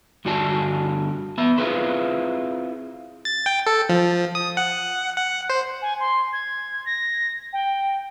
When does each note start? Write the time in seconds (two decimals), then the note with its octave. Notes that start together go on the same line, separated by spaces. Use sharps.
0.25 G2 D3 F#4 D5 G#5 A5
1.38 B3 E5
1.58 C4 E4 F4 G#4 B4 C5
3.25 A6
3.46 G5
3.67 A4
3.89 F3
4.35 D#6
4.57 F#5
5.16 F#5
5.50 C5
5.82 G#5
6.00 C6
6.33 G#6
6.86 A#6
7.53 G5